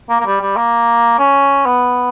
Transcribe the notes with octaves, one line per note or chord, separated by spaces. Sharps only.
A#3
A#3
G3
G3
A#3
C#4
B3